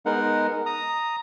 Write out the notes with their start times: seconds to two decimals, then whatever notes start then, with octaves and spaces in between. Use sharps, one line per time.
0.06 G#3 B3 D#4 A#4 F#5
0.66 A#5 D#6